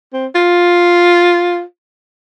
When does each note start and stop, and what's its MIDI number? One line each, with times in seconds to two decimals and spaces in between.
0.13 0.27 60
0.35 1.61 65